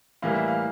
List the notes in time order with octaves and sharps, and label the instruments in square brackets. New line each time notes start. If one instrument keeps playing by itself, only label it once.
[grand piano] A2 E3 G3 A#3 F5
E5
F5